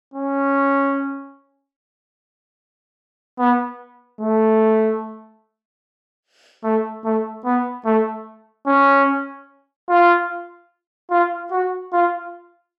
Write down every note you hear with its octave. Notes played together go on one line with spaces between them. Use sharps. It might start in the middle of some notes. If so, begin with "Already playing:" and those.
C#4
B3
A3
A3
A3
B3
A3
C#4
F4
F4
F#4
F4